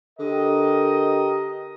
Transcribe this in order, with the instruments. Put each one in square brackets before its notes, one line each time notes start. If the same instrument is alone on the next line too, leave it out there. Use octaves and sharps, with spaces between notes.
[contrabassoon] D3 [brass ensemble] G4 A#4 D#5